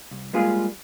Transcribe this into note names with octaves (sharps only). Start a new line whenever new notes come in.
C2
G3 G#3 A#3 F4 G#4